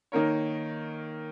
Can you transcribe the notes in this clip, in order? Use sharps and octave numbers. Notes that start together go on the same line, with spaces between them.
D#3 A#3 D#4 A#4 C#5